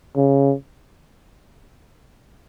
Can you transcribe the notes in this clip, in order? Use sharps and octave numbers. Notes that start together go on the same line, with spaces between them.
C#3